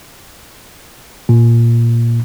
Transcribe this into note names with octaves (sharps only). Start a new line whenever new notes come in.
A#2